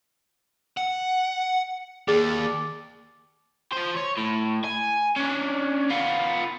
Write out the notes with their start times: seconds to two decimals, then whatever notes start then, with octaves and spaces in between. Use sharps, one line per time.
0.77 F#5
2.08 D#2 G#4 D5
3.72 F3 C5
3.96 C#5
4.17 A2
4.65 G#5
5.16 C#4 D4
5.90 B3 F4